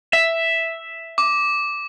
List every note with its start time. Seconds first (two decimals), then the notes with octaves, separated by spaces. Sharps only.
0.13 E5
1.18 D6